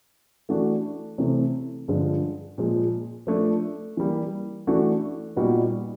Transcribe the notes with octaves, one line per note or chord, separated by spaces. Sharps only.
E3 A3 D4 F#4
C3 E3 A3 C4
G2 D3 F3 G#3
A#2 F3 G#3
F3 A3 D4
E3 G3 A#3
E3 A3 D4 F#4
A#2 G3 B3 D#4 F#4